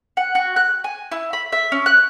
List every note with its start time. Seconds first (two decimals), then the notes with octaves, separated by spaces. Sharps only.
0.17 F#5
0.35 F#4
0.56 F#6
0.84 G#5
1.11 E4
1.33 B5
1.52 E5
1.72 C#4
1.86 F#6